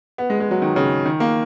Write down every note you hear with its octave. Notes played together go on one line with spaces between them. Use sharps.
B3
G#3
G#3
F#3
D#3
C#3
D#3
A#3